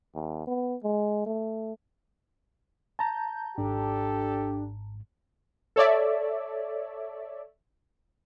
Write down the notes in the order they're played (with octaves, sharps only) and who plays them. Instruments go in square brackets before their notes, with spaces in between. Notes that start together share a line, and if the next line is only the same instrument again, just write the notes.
[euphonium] D#2
B3
G#3
A3
[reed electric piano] A5 A#5 [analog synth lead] G6
[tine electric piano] G#1 G#2 [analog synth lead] D4 [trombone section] G4 A4
[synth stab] A4 C#5 D5 E5